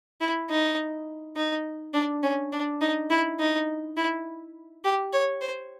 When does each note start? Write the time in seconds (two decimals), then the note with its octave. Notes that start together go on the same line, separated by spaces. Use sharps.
0.21 E4
0.50 D#4
1.36 D#4
1.94 D4
2.23 C#4
2.52 D4
2.81 D#4
3.11 E4
3.40 D#4
3.97 E4
4.85 G4
5.13 C#5
5.41 C5